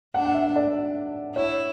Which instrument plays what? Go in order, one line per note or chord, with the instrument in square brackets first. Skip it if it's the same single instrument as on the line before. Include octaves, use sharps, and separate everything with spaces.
[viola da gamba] D4 [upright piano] F#5
[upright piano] F#5
E5
D5
[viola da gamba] E4 [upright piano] C#5